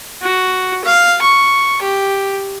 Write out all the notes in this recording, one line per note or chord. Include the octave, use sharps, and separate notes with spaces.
F#4
F5
C#6
G4